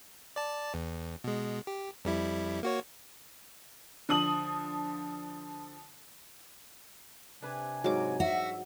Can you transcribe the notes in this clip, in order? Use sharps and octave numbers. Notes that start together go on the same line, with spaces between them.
D5 A5
E2
B2 G#3
G4
F2 G3 E4
A#3 F#4 C#5
D3 F3 D#6 F#7
C3 D4 B4 G#5
G#2 F#3 D6
F#4 E5